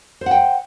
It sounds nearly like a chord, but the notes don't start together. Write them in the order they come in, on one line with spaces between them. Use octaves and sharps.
C5 F#5 G5